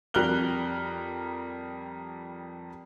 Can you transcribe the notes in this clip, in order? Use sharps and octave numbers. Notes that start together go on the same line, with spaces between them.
F2 G3 A#4 F6 F#6 G7